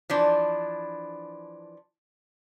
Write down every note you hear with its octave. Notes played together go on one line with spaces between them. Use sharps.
E3 F3 D4